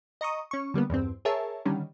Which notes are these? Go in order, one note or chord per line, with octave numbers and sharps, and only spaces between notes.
D#5 A#5 C#6 D#6
C#4 C#6
D3 G3 A#3 B3
E2 G2 C4
G#4 A#4 C#5 E5 A5
D3 D#3 G3 C#4